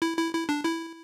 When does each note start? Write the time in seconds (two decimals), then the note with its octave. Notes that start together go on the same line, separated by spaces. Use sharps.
0.02 E4
0.17 E4
0.33 E4
0.49 D4
0.65 E4